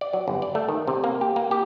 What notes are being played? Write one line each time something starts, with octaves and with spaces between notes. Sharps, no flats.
D5
F#3
G1
D5
A3
D#3
C3
A#3
G4
A#3
G4